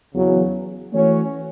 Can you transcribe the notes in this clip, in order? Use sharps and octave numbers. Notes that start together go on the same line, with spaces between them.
E2 C#3 F#3
E3 A3 C#4 F#4 C#5